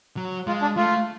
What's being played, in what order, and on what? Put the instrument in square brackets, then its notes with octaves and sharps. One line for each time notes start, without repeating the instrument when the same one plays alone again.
[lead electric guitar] F#3
[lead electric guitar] G#3 [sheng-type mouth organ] F4
[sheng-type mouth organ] D4
[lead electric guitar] A3 [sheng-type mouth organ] F4